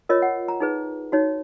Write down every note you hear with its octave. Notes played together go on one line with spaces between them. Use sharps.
F4 A#4 C#5 D#5
F#5
A#5
D#4 G#4 B4
D#4 F#4 C#5